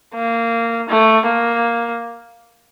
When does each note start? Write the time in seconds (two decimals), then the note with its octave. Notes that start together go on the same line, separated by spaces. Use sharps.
0.15 A#3
0.89 A3
1.26 A#3